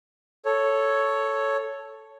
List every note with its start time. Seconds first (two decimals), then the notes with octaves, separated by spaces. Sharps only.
0.46 A4 C#5